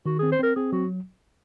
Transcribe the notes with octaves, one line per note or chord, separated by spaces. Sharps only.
D#3 F#4
C4 G#4
C5
C4 A#4
C4 G#4
F#3 F#4